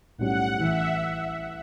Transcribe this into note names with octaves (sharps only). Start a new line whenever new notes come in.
B1 A2 G3 C#4 G4 F#5
A1 A2 E3 E5